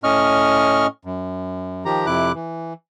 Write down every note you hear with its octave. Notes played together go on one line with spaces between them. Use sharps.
A2 C#4 D#5 C#6 F6
F#2
D#3 F3 G4 A#5
F2 C3 E4 D6 F#6
E3